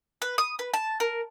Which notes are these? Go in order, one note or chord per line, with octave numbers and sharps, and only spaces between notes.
B4
D#6
B4
A5
A#4